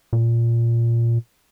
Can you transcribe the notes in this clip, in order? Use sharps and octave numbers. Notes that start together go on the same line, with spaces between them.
A#2